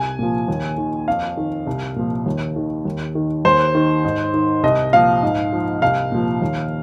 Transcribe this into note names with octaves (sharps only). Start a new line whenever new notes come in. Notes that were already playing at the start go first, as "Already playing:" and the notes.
Already playing: C2 G#5
A#2 F3
D#2
D#3
F2 F5
D#3
C2
A#2 F3
D#2
D#3
D#2
D#3
D#2 C5
D#3
G#2
D#3
C2 D#5
A#2 F3 F5
G#2
F3
C2 F5
A#2 F3
D#2